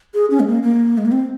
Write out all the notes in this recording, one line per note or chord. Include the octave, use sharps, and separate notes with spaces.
G#4
C#4
G#3
A#3
A#3
G#3
A#3
C4